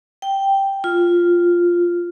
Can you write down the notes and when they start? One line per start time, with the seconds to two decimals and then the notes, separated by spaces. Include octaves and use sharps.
0.22 G5
0.84 F4